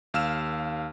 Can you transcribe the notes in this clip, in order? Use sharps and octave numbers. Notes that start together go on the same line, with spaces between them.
D#2 F5 E6 F6 E7